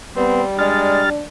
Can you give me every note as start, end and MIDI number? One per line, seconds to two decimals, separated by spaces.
0.16 1.10 55
0.16 0.42 59
0.16 0.44 60
0.59 1.02 56
0.59 1.25 62
0.59 1.10 89
0.59 1.10 93